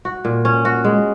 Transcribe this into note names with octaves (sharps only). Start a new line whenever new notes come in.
F#4
A#2
C#4
F#4
G#3